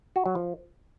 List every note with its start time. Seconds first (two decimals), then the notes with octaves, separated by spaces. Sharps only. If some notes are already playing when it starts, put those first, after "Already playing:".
0.16 F#4
0.26 F#3
0.35 F3